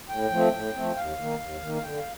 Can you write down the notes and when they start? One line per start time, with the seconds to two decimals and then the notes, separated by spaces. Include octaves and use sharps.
0.09 A2 G5
0.31 F3 A3 C4
0.53 A2
0.74 F3 A3 C4
0.96 D#2 F5
1.18 D#3 A#3
1.39 D#2
1.61 D#3 A#3
1.74 F5
1.82 D3 G5
1.97 F5